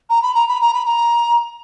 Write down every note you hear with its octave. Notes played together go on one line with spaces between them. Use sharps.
A#5
B5
A#5
B5
A#5
B5
A#5